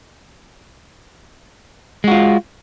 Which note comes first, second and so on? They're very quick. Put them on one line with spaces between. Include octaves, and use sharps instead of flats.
G#3 F#4 F4